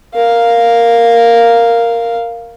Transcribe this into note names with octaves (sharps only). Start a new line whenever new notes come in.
A#4 F5